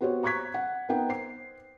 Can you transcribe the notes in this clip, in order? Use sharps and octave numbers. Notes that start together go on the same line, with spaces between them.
B3 F#4 G4 C5 C#5
A#5 C#6 F#6 G#6 B6
F#5
B3 D#4 A#4 F#5 G5
C5 C7